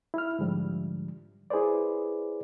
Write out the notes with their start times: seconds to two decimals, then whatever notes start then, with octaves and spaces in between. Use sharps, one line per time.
0.14 E4 F6
0.39 G#2 D3 F3 G3
1.50 E4 G#4 B4 C5 D5